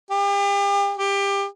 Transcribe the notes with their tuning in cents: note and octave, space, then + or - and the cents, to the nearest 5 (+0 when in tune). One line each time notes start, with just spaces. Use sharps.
G4 +40
G4 +25